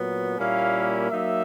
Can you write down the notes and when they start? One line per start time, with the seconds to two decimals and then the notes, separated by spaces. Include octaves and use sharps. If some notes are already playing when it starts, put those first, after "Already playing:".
Already playing: A#2 F#3 B3
0.38 A#2 G3 A#3 C#4 E4 F5
1.11 F#3 A#3 D#4 E5